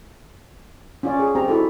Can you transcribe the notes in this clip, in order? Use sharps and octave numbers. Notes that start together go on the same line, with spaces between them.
C#4 F4 D5
G#4
C4 G4 A#5
D#4 E4 F#4 A4